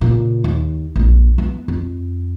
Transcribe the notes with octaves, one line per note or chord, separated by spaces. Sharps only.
A#2 C#3
D#2
A#1 F2
E3 B3
F2